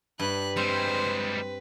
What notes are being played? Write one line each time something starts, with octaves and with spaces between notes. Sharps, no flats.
G2 B4 F#6
G3 G#3 C4 C5